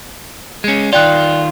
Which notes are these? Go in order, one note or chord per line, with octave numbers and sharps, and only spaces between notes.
G#3 C#4
D#3 F4 D5 G5 F#6